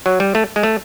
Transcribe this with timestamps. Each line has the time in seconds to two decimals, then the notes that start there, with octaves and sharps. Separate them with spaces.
0.06 F#3
0.20 G3
0.35 A3
0.56 G#3
0.63 A3